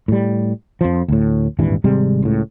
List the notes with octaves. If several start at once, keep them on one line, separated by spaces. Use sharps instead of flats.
A2 G3
F2 F3
D2 A2
D#1 G#1 G2 E3
G#1 C3 G3 G#3
C#2 A2